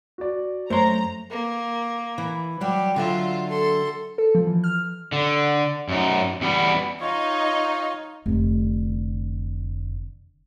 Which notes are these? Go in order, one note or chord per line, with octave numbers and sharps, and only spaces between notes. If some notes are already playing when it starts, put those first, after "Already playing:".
F#4 D5
F#2 A3 C5 C#5 A#5 C6
A#3
E3
F#3 G3 G4
D3 F#3 F4 E5
A4 C6
A4
F3
E3
F6
D3
F#2 D#4
E2 G3 B3
D#4 F4 C#5
F1 D3